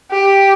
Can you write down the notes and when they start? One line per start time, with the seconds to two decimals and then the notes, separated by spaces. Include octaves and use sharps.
0.11 G4